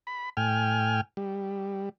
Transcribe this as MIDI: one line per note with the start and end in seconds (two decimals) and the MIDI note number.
0.07 0.29 83
0.37 1.01 45
0.37 1.01 79
0.37 1.01 80
0.37 1.01 89
1.17 1.89 55